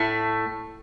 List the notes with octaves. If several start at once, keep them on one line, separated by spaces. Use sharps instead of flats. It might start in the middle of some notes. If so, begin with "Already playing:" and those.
Already playing: A2 A3